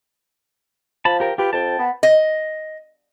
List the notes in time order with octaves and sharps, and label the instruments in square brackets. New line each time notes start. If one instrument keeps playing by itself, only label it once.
[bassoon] F3 [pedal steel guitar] A5 B5
[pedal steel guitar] G4 A#4 G5
[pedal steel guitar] F4 B4 [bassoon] G4
[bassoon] F2 [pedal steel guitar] G5 A5
[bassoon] B3
[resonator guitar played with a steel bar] D#5